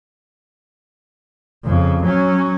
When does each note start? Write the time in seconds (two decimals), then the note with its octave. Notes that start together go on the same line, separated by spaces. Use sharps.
1.65 F2 C#3
2.03 F#3 C#4